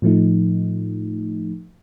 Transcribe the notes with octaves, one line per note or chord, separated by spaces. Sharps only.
A2 F3 A3 D#4